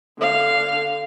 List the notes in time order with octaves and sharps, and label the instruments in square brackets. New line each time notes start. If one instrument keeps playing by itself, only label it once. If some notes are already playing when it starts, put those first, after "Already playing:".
[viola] D3 F5